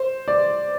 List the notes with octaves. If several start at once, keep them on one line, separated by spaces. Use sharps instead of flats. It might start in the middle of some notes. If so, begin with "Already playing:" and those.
Already playing: C5
D5